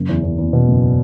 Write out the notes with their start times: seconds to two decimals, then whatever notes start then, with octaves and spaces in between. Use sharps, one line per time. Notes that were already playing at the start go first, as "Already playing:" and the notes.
Already playing: F#1
0.09 E2
0.23 E2
0.38 E2
0.53 B2
0.68 F#1